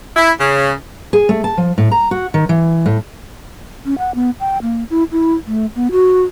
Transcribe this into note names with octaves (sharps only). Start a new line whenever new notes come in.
E4
C#3
G#4
A3
A5
F3
A2
A#5
F#4
D#3
E3
A2
C#4
F#5
B3
G5
A#3
E4
E4
A3
B3
F#4